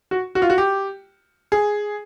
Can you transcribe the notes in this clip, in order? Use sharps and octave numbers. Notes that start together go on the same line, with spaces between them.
F#4
F#4
F4
F#4
G4
G#4